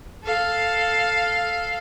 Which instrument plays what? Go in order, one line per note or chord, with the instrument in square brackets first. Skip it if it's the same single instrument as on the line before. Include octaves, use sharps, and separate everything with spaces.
[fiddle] A4 F5